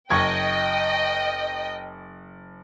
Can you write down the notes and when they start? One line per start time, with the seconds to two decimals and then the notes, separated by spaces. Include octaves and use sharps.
0.10 F#1 D#5 G5 C#6 G#6